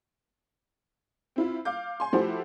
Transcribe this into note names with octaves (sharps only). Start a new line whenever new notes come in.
C4 E4 F4
F5 D6 G6
G#5 C6
F3 A3 E4 F#4 G4 C5